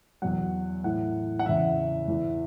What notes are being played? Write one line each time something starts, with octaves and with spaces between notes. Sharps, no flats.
E2 B2 F#3 F#5
A2 E3 F#5
F#5
E2 C#3 E3 E5
E2 E3